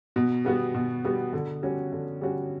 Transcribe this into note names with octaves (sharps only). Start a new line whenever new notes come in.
B2
G3 B3 F#4
B2
G3 B3 F#4
D3
G3 C#4 F#4
D3
G3 C#4 F#4